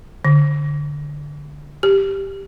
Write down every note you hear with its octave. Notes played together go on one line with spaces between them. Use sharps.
D3
G4